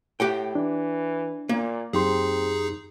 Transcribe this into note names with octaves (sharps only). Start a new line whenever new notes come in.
A2 G4 F#5 G5
E3 D4
A#2 A#3
F#2 C4 D#4 G4 G#4 C6